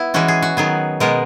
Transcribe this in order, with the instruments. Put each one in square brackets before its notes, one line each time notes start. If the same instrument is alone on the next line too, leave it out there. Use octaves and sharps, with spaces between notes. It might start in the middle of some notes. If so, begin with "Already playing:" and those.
Already playing: [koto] B3 E4
E3 G#3 C#4 F#4
G#4
F#4
D#3 F#3 B3 G#4
B2 G#3 B3 A#4